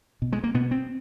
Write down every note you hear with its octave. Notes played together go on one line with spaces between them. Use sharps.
B2
G#3
A#3
B2 B3
C4